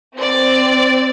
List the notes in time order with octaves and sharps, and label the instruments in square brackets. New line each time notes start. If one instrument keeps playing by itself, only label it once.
[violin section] C4 D5